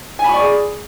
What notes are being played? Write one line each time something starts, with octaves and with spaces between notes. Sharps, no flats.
G#4 D5 G#5 B5 C#6